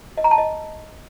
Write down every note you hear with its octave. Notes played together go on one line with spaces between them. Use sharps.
D#5
A#5
A5
D#5